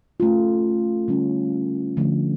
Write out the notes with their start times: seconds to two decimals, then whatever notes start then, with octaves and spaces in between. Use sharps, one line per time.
0.20 A3 C#4 F4
1.08 D3 G3 C#4
1.97 D3 F3 A3